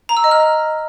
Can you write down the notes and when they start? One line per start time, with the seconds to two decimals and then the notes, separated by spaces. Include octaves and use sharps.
0.09 A#5
0.17 E6
0.24 D#5
0.31 F6